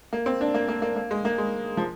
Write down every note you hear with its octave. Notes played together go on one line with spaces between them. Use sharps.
A#3
C4
D4
A#3
A#3
A#3
A#3
G#3
A#3
G#3
F3